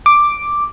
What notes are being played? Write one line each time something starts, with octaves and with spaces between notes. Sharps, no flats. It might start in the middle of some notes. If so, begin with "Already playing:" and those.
D6